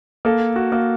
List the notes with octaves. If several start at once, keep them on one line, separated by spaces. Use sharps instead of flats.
A#3 A4
F#4
A#3